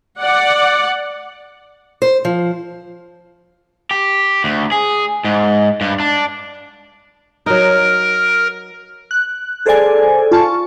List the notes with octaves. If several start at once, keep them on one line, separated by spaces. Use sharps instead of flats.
D5 F#5
C5
F3
G4
D2
G#4
G#2
G2
D4
F#3 D#4 A#4
F#6
G#4 A4 C5 D5 G#5
F4 A5 C#6